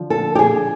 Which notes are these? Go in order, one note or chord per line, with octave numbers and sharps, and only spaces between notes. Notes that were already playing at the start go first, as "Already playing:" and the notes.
Already playing: D3 F3
A4
G4
G#4